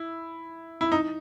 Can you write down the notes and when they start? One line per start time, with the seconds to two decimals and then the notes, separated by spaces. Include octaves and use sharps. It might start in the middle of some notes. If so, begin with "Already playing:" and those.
Already playing: E4
0.81 E4
0.92 D#4